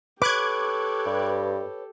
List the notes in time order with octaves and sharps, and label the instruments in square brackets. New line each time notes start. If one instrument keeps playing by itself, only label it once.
[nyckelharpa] G4 A4 [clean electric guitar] B4 C#5 [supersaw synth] D6 F#6 G#6
[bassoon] G2